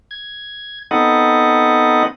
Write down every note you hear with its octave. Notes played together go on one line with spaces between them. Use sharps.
G#6
B3 C4 D#4 A4 D#5 F#5